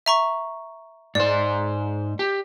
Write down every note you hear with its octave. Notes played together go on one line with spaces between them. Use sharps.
E5 A#5 C#6
G#2 C5 D5
G4